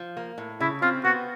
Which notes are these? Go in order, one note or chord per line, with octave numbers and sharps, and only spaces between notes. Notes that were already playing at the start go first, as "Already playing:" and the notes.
Already playing: F3
A#3
A2
C#3 E4
C4 F4
B3 F#4